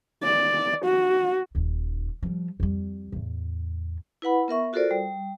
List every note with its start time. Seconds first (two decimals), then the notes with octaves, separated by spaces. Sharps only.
0.23 D5
0.84 F#4
1.55 D#1 D#2
2.23 F3 G3
2.60 F2 G3
3.12 E2 A2
4.22 E4 B4 F#5 B5
4.48 B3 A#4 E5 C#6
4.73 F4 F#4 A4 A#4 C5 D5
4.91 G3